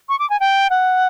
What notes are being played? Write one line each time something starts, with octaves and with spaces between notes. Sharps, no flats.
C#6
D6
G#5
G5
F#5